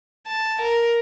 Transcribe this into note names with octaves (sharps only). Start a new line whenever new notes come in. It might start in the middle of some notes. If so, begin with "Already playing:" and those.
A5
A#4